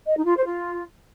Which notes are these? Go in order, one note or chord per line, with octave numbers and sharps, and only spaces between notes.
D#5
D#4
F4
C5
F4